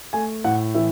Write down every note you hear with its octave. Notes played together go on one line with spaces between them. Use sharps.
A3 G#5
A2 F#5
E3 E5